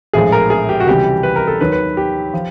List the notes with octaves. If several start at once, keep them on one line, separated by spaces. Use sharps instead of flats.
A#1 A2 F3 G#3 G#4
A#4
G#4
G4
F#4
C#2 C3 E3 G3 G4
B4
A#4
A4
D#2 D#3 F#3 B4
B4
G4
F3